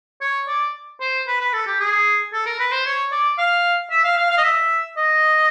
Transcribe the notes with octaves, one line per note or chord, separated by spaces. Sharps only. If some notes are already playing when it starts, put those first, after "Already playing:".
C#5
D5
C5
B4
B4
A4
G4
G#4
A4
A#4
B4
C5
C#5
D5
F5
E5
F5
F5
F5
D#5
E5
D#5